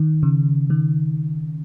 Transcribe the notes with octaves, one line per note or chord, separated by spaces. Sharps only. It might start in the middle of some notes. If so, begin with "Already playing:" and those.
Already playing: D#3
C#3
D#3